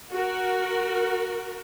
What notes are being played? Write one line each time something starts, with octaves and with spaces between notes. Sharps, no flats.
F#4 A#4